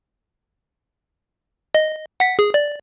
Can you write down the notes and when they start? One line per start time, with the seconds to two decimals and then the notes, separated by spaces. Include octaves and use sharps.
1.75 D#5
2.20 F#5 B6
2.39 G#4
2.54 D5